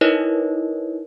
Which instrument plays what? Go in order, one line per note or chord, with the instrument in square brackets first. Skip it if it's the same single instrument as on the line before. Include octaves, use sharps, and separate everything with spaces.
[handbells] D#4 E4 A#4 B4 C#5 D#5